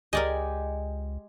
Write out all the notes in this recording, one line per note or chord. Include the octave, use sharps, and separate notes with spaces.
C#2 G#3 G4 A#4 D5 D#5 G#5